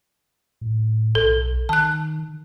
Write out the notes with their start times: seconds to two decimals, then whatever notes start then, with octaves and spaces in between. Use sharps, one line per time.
0.61 A2
1.15 B1 A4
1.69 D#3 A5 F#6